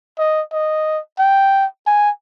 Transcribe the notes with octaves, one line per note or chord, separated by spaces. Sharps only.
D#5
D#5
G5
G#5